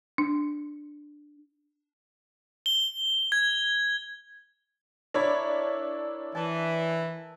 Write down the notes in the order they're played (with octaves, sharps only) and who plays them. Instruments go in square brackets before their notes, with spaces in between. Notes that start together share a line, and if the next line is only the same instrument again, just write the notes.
[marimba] D4
[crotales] G7
G#6
[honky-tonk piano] D4 C#5 D5 [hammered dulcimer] E4 A#4
[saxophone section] E3 [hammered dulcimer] A5